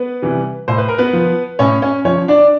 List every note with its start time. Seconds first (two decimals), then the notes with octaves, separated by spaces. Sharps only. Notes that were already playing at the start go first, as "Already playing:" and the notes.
Already playing: B3 B4
0.22 C3 E3 G3
0.68 A2 C5
0.78 B4
0.88 A#4
0.98 B3 B4
1.13 F3
1.59 A2 C#4 C#5
1.82 C#4 C#5
2.05 F3 C#4 C#5
2.28 D4 D5